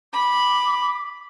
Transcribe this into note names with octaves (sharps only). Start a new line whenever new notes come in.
B5 D6